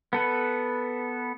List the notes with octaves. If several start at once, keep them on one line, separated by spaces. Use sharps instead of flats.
B3 A4 B4